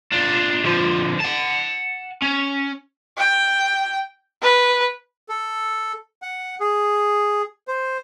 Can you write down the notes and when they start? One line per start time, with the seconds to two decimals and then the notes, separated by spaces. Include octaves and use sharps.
0.12 D4 F4
0.65 D3 F3
1.20 F#5 A5
2.22 C#4
3.18 G5
4.42 B4
5.29 A4
6.22 F#5
6.60 G#4
7.68 C5